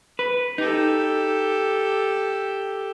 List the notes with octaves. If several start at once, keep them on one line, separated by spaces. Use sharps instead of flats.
B4
D#4 G4 A4